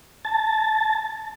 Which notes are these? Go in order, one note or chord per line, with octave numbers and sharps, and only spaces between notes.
A5